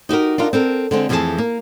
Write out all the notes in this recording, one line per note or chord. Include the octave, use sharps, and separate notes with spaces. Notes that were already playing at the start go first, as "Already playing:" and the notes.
D#4 F#4 G4 A#4
D4 D#4 F4 A#4
C4 A4 A#4
D3 G#3 C4
F2 E3 F3 A3 G#4 A5
A#3